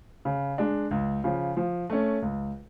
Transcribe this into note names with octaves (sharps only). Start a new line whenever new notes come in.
C#3
G#3 D4
C#2
C#3 F3
F3
A3 C#4
C#2